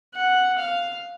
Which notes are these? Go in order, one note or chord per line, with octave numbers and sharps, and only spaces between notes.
F#5
F5